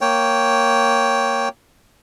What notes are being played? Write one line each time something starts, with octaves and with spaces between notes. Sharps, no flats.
A#3 C#5 G5